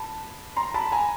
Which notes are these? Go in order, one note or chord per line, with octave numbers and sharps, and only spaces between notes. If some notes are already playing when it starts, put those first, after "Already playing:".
Already playing: A5 B5
A#5 C6
A5 B5
G#5 A#5